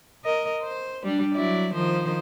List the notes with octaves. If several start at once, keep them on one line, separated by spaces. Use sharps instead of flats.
A#4 D#5
C5
G3 D4
F#3 E4 D5
D#3 F3 C5